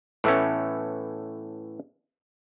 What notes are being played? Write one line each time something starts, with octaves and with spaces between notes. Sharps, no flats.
A2 E3 A3 B3 C#4